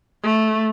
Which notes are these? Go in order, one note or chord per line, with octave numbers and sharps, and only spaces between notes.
A3